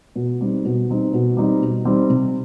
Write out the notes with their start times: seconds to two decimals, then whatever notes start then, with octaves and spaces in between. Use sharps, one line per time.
0.16 B2
0.41 G3 C4 D#4
0.65 B2
0.89 G3 C4 D#4
1.13 B2
1.37 G3 C4 D#4
1.61 B2
1.85 G3 C4 D#4
2.10 C3